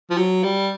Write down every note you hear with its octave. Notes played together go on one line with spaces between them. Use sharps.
F3
F#3
G3